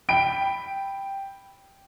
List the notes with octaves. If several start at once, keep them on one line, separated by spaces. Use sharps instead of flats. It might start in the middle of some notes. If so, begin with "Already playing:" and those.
G5 B5 D7